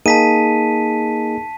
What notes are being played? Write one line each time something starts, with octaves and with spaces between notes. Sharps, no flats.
A#3 D#4 G#4 A5 B6 D#7